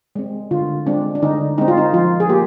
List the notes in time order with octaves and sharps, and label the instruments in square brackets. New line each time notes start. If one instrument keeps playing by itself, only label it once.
[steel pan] G#3 C4
D3 F4
G#3 C4 D4
D4
D3 D#4
G#3 C4 D#4
F4
D#4
F3 F4
G#4
A#3 G4